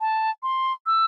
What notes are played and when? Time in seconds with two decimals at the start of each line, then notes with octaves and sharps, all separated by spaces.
0.01 A5
0.43 C6
0.86 E6